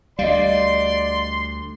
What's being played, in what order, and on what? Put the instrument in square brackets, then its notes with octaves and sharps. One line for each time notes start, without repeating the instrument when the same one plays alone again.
[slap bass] D2 G3 [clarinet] D5 [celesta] D#5 F5 [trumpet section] C6